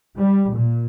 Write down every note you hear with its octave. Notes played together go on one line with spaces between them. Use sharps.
G3
A#2